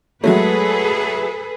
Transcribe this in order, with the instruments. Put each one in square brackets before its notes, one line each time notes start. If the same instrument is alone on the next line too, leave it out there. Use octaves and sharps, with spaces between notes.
[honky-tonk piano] F#3 G#3 A3 [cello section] G#4 A4 B4